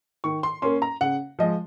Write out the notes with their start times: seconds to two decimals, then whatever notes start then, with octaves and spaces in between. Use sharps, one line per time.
0.24 D#3 C#6
0.43 C6
0.62 A#3 C#4 C6
0.82 A#5
1.01 C#3 F#5
1.39 F3 G#3 D#5